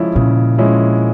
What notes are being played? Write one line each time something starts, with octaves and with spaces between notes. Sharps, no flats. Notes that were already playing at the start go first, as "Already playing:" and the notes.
Already playing: C#3 F3 G#3 C#4 E4
A#2 C#3
F3 G#3 C#4 E4